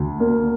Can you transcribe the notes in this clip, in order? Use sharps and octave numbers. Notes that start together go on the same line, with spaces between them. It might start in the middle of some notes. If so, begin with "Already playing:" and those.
Already playing: D2
A#3